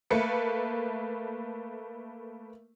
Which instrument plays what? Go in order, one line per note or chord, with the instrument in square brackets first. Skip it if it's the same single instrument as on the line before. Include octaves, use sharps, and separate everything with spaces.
[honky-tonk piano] A3 A#3 B4 C#7